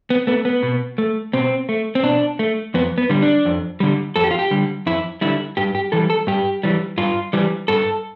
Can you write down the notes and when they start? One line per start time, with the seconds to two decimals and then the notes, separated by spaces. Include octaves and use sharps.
0.10 B3
0.27 A3 B3
0.45 B3
0.63 B2
0.98 A3
1.33 B2 C4
1.69 A3
1.95 C4
2.03 B2 D4
2.39 A3
2.74 F2 B3
2.98 B3
3.09 D3 G3
3.22 D4
3.45 F2
3.80 D3 G3
4.16 F2 A4
4.24 G4
4.31 F4
4.39 G4
4.51 D3 G3
4.86 F2 E4
5.21 D3 G3 E4
5.57 G2 G4
5.75 G4
5.92 E3 G3 A4
6.10 A4
6.27 G2 G4
6.63 E3 G3
6.98 G2 F4
7.33 E3 G3
7.68 G2 A4